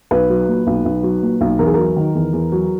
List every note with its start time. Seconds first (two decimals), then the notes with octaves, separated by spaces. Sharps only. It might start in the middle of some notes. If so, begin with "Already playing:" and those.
0.11 B1 B4
0.30 F#3
0.48 A#2
0.67 B1
0.85 B1
1.03 F#3
1.22 A#2
1.41 B1
1.59 E2 A#4
1.66 G#4
1.74 F#3 A#4
1.96 D#3
2.15 E2
2.33 E2
2.52 F#3